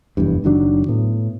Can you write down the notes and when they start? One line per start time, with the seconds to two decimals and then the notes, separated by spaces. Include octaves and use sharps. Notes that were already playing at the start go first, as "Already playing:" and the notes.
0.17 F1 E2 G2
0.44 F#1 D#3 F#3 D4
0.88 A2 B3